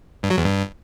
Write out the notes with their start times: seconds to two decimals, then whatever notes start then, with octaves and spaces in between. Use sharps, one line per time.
0.23 G2
0.30 F#3
0.38 E2
0.45 G2